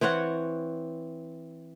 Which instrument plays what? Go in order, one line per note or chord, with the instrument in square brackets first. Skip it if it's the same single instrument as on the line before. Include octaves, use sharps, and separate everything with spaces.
[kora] E3 C4 C#5 F#5